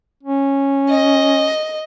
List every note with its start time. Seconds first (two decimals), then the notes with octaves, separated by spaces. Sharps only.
0.23 C#4
0.90 D#5